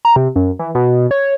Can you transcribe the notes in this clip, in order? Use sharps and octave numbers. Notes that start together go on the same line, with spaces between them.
A#5
C3
F#2
E3
B2
C#5